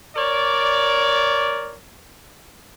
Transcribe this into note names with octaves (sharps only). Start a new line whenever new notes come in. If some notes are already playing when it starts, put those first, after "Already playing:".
A#4 C#5 D5